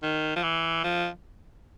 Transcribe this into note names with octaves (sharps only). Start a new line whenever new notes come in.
D#3
F3
E3
F3